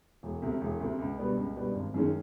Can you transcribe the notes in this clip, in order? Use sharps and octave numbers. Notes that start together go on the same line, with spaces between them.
E1
D2 C3
E1
D2 C3
C#2
B2 G3 B3 D4
C#2
B2 G3 B3 D4
G#1
F#2 D#3 G#3 C#4